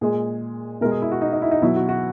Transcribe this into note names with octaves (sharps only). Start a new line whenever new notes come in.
A#2 G#3 G#4
B2 G#3 A#4
G#4
E4
F#4
D#4
D#4
E4
D#4
B2 F#3 E4
F#4
F#4